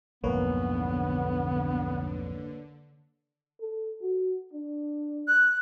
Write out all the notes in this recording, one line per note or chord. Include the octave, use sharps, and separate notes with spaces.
B1 F2 G#2 D3 A#3 B3 B4 C#5
A4
F#4
D4
F#6